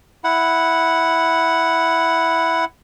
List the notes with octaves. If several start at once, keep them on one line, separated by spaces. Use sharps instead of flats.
E4 F#5